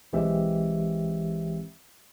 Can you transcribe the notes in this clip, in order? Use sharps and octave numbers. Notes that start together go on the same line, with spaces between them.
B1 E3 G#3 C4 G4 E5